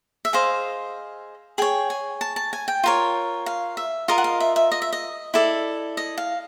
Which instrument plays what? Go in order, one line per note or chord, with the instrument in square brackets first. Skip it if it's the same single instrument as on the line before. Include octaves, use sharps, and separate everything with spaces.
[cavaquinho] E5
G#4 C5 D#5 F5
G#4 C#5 G5
G#5
A5
A5
G#5
G5
F4 A#4 C#5
F5
E5
F4 A#4 D#5 F5
F#5
F5
E5
E5
D#5
E5
D#5
E4 A4 D5
D#5
F5